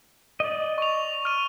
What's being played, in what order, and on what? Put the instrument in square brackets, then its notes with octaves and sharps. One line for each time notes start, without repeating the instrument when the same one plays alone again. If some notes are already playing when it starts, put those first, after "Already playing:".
[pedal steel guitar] D5 D#5
[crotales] C#6 F7
F6 D#7